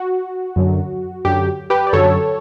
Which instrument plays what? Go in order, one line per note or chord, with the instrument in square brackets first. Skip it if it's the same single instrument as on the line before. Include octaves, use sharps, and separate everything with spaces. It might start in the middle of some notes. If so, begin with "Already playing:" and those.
Already playing: [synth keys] F#4
F#2 D3 F#3
F#2 D3 F#3 G4
G4 B4
D5
F#2 D3 F#3 A4 C#5